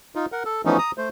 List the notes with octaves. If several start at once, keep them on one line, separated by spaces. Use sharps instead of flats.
D#4 F4
A#4 F#5
A4
E3 F3 A3 B3 C#4 D#4
A#5 D#6
A3 C5